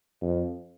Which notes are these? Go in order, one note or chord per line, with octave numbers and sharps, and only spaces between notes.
F2